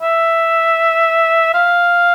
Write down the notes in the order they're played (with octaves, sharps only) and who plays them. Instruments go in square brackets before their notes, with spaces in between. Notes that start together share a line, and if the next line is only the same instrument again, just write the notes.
[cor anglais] E5
F5